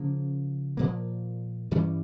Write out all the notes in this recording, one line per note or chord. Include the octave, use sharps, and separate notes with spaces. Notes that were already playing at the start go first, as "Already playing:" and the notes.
Already playing: C#3 F3 A#3 C#4
A#2 F3 A#3
G2 E3 G3 C#4